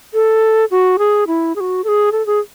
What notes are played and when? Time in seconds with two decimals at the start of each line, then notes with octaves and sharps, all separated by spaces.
0.14 A4
0.71 F#4
0.99 G#4
1.27 E4
1.56 G#4
1.60 F#4
1.84 A4
1.88 G#4
2.12 A4
2.26 G#4